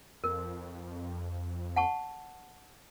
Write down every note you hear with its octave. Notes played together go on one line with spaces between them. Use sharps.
F2 A#4
F#5 A5 C#6